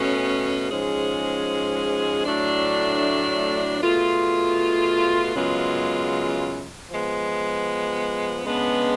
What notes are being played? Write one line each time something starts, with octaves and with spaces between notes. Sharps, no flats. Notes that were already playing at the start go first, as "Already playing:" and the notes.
Already playing: B2 A3 C#4
G#2 F3 G#3 C#4 G#4
A2 F#3 A3 D4
B2 A3 F4 G#4
F#2 C#3 G#3 B3 F4
F3 G#3 B3
C#3 G#3 B3 D4